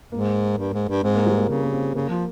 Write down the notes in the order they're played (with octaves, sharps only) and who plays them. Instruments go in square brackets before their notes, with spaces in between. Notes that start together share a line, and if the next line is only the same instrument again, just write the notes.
[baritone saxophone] G#2 [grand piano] A#3
[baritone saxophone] G2
G#2
G2
[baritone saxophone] G#2 [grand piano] C4
[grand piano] A#3
G3
A#3
[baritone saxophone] C#3 [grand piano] A#3
[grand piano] A#3
C4
[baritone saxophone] C#3 [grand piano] A#3
[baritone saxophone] F3